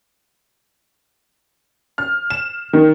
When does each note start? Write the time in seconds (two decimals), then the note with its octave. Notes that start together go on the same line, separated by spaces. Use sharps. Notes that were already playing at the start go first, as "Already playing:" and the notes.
1.98 F6
2.30 E7
2.73 D#3